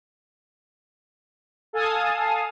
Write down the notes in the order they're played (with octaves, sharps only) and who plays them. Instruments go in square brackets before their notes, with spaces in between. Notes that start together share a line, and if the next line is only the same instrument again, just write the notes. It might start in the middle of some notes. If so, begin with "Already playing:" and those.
[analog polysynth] A4 F5 G#5 A5 D#6